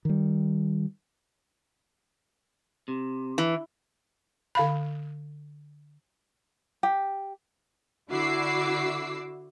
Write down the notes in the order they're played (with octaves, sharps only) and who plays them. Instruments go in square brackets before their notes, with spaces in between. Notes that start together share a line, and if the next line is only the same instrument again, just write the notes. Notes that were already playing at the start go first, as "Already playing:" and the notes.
[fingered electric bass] D#3 G3
[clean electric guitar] C3
[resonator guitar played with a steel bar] E3
[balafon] D3 F5 B5
[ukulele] G4
[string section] D3 E4 F#4 D6 E6 C7